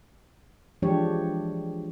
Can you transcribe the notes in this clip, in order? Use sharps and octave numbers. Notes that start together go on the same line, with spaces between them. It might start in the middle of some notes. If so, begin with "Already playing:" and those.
E3 F3 G#3 D4 G4 C#5